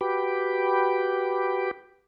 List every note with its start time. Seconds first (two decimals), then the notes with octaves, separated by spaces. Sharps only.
0.01 F#4 G4 B4 G5 B5 D6